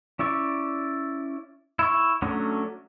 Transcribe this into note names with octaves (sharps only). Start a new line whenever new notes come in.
C#4 E4 D5 C#6
E4 C#6
F#3 A3 C#4 D4 F#4